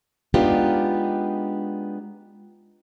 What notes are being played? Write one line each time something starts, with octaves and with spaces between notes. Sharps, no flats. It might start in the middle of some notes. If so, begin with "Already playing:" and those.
G#3 B3 D4 D#4 F4 G4